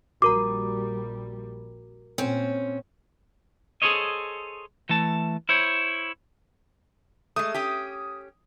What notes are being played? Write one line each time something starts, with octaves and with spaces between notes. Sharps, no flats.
A#1 G3 F#4 A#4 A#5 D6
A#2 C4 C#4
G#4 A4 C5 C#5 D#5
E3 A3 A5
E4 C5 C#5
G#3 A3 D#6
C#4 G4